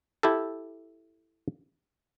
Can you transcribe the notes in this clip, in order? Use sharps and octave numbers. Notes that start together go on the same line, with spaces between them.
E4 G4 A4